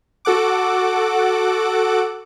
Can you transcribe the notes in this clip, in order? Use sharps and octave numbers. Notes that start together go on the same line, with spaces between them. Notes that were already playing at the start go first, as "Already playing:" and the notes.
F#4 A4 F#5 D6